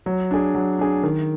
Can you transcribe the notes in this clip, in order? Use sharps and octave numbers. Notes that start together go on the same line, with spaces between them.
F#3
D4 G#4
F#3
D4 G#4
D#3